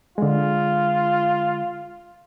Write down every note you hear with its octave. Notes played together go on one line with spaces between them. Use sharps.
D3 G#3 F4